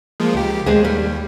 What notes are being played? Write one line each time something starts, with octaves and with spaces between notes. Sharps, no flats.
F3 G#3 A#3
C#2 G4
D#2 G#3 C4 G#4
G3